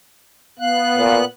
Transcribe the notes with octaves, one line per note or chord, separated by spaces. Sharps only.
B3 F5 F#6
A#2